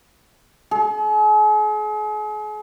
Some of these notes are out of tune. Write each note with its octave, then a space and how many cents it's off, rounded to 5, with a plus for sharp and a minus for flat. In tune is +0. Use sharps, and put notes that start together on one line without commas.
G#4 +40